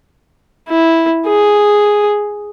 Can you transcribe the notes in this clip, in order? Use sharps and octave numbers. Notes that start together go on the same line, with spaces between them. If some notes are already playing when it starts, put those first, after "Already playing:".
E4
G#4